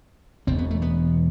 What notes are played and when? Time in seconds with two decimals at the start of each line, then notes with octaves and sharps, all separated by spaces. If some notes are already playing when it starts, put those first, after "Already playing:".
0.47 E1 E2 B2 C4
0.58 B3
0.71 A3
0.82 B3